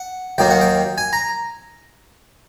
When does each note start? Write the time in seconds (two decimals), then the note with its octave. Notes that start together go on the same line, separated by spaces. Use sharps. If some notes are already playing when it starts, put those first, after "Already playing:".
Already playing: F#5
0.38 D#2 D#3 F#3 A#3 G5
0.50 F#5
0.61 G5
0.98 G#5
1.13 A#5